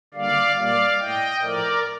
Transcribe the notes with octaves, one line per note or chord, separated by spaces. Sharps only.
D3 G3 A#3 D5 F5
A#2 G3 A#3 D5 F5
A2 A3 D#5 G5
A2 F3 A3 A#4 D5